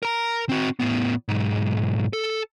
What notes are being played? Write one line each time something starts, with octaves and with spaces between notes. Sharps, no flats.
A#4 A#5
C4 F#4
A2 B3
B1 G#2
A4